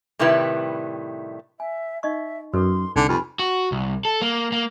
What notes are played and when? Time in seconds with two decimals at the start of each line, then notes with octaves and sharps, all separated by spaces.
0.19 A2 C3 D#3 G3 E4 B4
1.60 E5 G#5
2.03 D#4 D#5 E5 C#6
2.54 F#2 A4 B4 C6
2.96 C2 D3 D#4 G#5
3.09 F2 G4 B4 G#5 B5
3.39 F#4
3.72 C2
4.05 A4
4.22 A#3
4.52 A#3